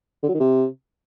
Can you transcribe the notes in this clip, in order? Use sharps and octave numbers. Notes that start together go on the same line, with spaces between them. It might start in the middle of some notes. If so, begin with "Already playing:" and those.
D3
F#3
D#3
C3